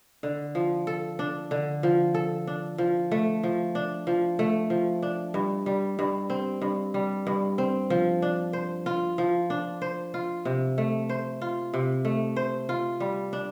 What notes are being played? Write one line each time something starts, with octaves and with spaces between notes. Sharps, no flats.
D3
F3
A4
D4
D3
F3
A4
D4
F3
A3
F3
D4
F3
A3
F3
D4
G2
G3
G2
C4
G2
G3
G2
C4
F3
D4
C5
F4
F3
D4
C5
F4
C3
A3
C5
F4
C3
A3
C5
F4
G3
D4